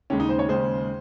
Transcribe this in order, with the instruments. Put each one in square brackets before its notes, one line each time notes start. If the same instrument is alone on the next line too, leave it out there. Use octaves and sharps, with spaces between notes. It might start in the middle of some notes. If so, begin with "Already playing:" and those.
[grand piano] D#2 C#3 G#3 C#4
D#4
C5
C#5
D#2 C#3 G#3 C5